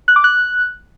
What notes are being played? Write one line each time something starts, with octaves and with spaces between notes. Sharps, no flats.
F#6
D6
F#6